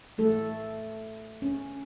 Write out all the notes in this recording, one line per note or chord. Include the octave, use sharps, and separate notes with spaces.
E3 A3 A4
C#4